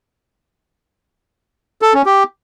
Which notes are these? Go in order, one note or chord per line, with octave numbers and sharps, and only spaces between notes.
A4
C#4
G4